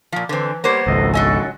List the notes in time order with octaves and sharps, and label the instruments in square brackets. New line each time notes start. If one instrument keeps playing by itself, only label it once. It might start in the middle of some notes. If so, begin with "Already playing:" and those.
[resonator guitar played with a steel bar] A#2 F3
[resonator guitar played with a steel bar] D3 C4 [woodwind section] E3
[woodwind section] G3 G4 C#5 [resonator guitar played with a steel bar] A#3 B3 C5
[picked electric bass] G#1 C#2 [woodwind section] A4 D#5
[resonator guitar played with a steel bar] F#3 D#5 G#5 [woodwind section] A4